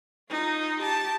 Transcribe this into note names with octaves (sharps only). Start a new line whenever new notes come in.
D#4 F4
G4 A5